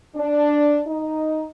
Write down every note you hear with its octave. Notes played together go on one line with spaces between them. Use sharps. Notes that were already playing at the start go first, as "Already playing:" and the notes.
D4
D#4